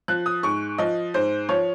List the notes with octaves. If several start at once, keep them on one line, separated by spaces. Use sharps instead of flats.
F3 F#6
D#6
G#2 C#6
F3 D#5
G#2 C5
F3 C#5